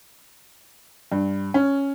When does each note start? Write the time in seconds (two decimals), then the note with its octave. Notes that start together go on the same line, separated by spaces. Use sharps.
1.12 G2
1.54 C#4